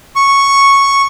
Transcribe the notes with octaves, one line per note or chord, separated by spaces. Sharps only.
C#6